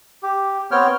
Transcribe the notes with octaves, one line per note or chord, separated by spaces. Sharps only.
G4
B3 C4 C#5 G5 F6